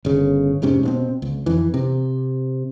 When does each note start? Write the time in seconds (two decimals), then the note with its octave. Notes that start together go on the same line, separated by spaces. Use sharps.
0.05 G1 C#3
0.62 F1 G#2 C3 C#4
0.83 B2 B3 C4
1.22 C#2
1.46 F2 E3
1.74 C3